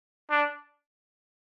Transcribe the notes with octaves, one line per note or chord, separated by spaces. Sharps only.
D4